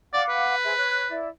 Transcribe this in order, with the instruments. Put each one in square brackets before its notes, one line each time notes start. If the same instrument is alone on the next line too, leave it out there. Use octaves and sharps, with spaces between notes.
[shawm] D5 [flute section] F5 F#5 D6
[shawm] B4
[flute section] G#4 C5 E5
C#5 F#6
E4 D5